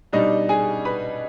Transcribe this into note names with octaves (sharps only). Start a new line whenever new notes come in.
B2 G3 D4 D#4 D#5
G#4 G#5
B4 B5